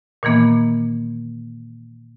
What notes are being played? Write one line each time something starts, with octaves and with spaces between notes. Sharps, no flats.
A#2 D#3 E3 A#3 B3